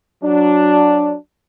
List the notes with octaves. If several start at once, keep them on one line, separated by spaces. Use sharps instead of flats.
F#3 D4